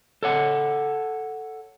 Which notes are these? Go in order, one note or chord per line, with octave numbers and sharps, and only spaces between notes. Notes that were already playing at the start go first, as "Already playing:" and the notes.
A4 C#5 F#5